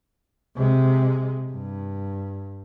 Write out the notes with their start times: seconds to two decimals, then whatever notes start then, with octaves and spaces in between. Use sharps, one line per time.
0.55 C3 G#3
1.50 G2